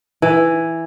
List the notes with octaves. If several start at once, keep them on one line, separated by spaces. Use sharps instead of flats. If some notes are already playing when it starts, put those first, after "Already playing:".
E3